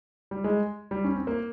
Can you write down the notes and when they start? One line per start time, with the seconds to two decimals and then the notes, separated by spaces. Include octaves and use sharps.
0.31 G3
0.44 G#3
0.91 G3
1.04 C#4
1.16 C4
1.27 A#3